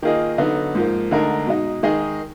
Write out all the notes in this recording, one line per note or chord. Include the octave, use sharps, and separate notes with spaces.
D#3 A#3 F4 G#4 D#5
D3 F#3 B3 D#4 F#4
G#2 F3 A#3
D2 D3 G#3 D#4 A#4
B2 G#3 D#4
D#3 G#3 D#4 G#4 D#5